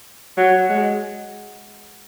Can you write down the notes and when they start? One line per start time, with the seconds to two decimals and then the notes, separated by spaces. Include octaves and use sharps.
0.37 F#3
0.69 G#3